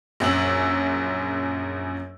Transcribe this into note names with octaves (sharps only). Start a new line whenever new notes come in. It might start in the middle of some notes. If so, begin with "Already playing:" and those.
A#1 F#2 E6 F#7